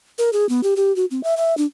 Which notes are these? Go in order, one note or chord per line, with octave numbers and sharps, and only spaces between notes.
A#4
G#4
B3
G4
G4
F#4
C4
E5
E5
D4